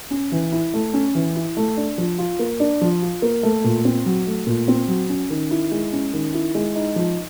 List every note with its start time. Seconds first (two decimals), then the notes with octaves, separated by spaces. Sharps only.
0.11 C#4
0.32 E3
0.52 E4
0.74 A3
0.94 C#4
1.15 E3
1.36 E4
1.57 A3
1.77 D4
1.98 F3
2.18 F4
2.39 A#3
2.60 D4
2.81 F3
3.02 F4
3.22 A#3
3.43 A3
3.64 A#2
3.85 C4
4.06 F#3
4.27 A3
4.47 A#2
4.68 C4
4.88 F#3
5.09 C#4
5.30 D#3
5.51 E4
5.72 G#3
5.93 C#4
6.13 D#3
6.34 E4
6.55 G#3
6.75 D#4
6.96 F3